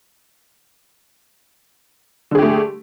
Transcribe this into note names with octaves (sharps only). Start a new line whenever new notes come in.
D3 A3 G4 G#4